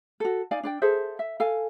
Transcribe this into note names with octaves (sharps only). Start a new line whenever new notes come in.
F#4 A4
D#4 D5 F5 G#5
D4 D5 G5
G#4 A4 C5 E5
E5
A4 F5 G#5